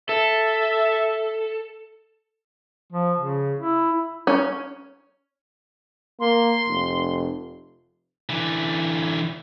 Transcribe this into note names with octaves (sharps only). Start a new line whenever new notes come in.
A4 E5
F3
C#3
E4
C#4
A#3 C6
F1
D3 E3